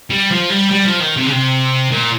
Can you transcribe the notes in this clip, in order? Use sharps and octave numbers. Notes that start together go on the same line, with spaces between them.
G3
F3
G3
G3
F3
D#3
C3
C#3
C3
A#2